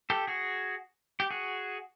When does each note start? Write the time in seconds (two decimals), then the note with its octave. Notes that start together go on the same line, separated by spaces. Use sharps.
0.10 G4 A4
0.27 F#4 G#4
1.20 G4
1.31 F#4 G#4